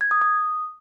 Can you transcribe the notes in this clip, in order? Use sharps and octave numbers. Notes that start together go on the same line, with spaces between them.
G#6
D#6
D#6